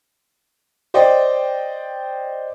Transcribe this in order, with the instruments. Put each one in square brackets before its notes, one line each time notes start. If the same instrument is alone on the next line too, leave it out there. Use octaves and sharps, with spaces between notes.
[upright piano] C5 D5 D#5 G5